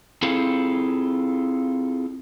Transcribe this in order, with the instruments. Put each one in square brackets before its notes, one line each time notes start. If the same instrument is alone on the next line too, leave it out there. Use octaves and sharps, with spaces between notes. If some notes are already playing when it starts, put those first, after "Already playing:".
[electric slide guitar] C4 E4 F4 G#4 A4